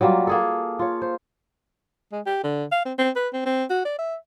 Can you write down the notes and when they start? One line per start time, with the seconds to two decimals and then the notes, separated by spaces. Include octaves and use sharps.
0.01 F#3 G3 A#3 F4
0.27 A#3 G#4 A4
0.79 F4 C#5
1.02 C5
2.12 G#3
2.26 G4
2.44 D3
2.72 F5
2.85 C4
2.98 C4
3.16 B4
3.33 C4
3.46 C4
3.70 F#4
3.85 D5
3.99 E5